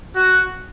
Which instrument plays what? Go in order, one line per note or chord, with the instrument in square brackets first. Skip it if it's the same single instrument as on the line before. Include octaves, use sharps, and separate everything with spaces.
[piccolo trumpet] F#4